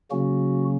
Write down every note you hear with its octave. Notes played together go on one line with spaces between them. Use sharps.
C#3 F#3 A#3 C#4 F#4